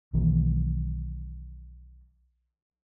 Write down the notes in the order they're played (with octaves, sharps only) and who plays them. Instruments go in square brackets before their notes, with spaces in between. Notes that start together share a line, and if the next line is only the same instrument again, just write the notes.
[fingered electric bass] B1 D#3 E3 A#3